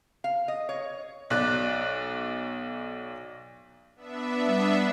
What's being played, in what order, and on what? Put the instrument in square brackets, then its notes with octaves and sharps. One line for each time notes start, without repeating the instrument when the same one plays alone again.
[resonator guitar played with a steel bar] F5
D#5
C#5
[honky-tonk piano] B1 D5 F#6
[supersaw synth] B3 D4 E5
[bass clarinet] G3